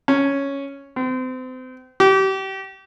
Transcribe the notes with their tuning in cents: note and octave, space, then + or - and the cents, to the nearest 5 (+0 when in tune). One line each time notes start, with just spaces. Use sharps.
C#4 +0
C4 -35
G4 -30